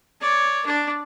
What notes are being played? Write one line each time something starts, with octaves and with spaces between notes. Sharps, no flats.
C#5 D5
D4 D5